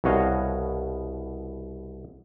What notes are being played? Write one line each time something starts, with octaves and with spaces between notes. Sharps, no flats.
C2 B2 F#4 C#5 D#5 F5